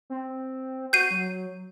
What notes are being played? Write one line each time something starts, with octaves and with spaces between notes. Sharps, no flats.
C4
F#4 G6 C7 D#7
F#3